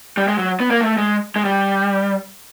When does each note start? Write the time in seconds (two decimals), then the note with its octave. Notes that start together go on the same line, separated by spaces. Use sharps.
0.17 G3
0.28 G#3
0.38 F#3
0.60 B3
0.71 A#3
0.81 A3
0.98 G#3
1.36 G#3
1.45 G3